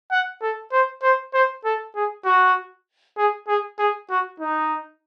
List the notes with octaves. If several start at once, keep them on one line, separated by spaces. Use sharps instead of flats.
F#5
A4
C5
C5
C5
A4
G#4
F#4
G#4
G#4
G#4
F#4
D#4